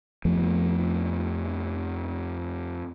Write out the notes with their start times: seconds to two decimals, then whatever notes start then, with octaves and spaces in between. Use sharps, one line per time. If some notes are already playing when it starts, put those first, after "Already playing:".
0.25 F2 F3 A3 B3